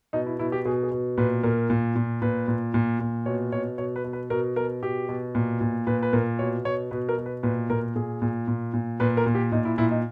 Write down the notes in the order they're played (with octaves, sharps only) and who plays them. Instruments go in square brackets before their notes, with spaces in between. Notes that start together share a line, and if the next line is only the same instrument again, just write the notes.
[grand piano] B2 D#4
E4
B2 E4
G4
B2 G#4
G#4
B2
A#2 B4
A#2 A#4
A#2
A#2
A#2 B4
A#2
A#2
A#2
B2 C#5
B2 C#5
B2 C#5
B4
B2
B4
B2 A#4
B2 A#4
B2 G4
B2
A#2
A#2
A#2 B4
B4
A#2 A#4
B2 C#5
B2 C#5
B2 B4
A#4
B2
B4
A#2 B4
A#2 A#4
A#2 G#4
A#2
A#2
A#2
A#2 B4
A#4
A#2
G4
A#2 D#4
E4
A#2 E4
D#4